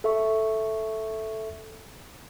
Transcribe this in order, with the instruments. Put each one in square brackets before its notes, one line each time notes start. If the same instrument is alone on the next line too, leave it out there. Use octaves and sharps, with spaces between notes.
[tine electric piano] A4 E5 C#6